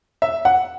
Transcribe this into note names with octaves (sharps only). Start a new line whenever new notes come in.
E5
F#5